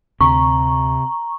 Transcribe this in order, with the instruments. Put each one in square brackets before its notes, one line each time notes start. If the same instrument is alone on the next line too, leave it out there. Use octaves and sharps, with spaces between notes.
[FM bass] D2 [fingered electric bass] C3 [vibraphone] A#5 [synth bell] C#6